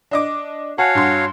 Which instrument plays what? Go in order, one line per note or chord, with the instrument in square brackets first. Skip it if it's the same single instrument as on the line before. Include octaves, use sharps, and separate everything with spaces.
[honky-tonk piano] D4 D#5 D6
[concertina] F#4 C#5 F5 [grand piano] F#5 G#5 A5
[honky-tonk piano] G2 C6